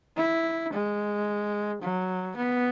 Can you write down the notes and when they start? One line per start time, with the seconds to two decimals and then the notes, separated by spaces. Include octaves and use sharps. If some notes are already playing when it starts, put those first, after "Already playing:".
0.17 E4
0.73 G#3
1.82 F#3
2.37 B3